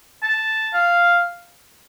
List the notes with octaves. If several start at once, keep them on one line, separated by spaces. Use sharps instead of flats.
A5
F5